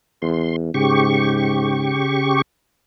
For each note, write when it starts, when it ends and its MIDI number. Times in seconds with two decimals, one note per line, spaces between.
0.22 0.70 40
0.22 0.56 84
0.74 2.04 44
0.74 2.42 49
0.74 2.42 67
0.74 2.42 85